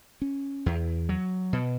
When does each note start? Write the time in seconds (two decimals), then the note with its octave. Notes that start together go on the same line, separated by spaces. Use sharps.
0.22 C#4
0.66 E2
1.09 F#3
1.53 B2